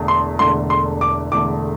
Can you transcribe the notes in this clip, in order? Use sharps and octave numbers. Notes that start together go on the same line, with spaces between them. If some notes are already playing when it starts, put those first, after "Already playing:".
Already playing: E1 E2 D3 A3
C6
E1 E2 D3 A3 C6
C6
D6
E1 E2 D3 A3 D6